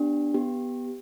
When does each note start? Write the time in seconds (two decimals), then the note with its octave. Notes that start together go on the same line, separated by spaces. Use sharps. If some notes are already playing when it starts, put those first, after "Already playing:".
Already playing: B3 D4 G4
0.34 B3 G4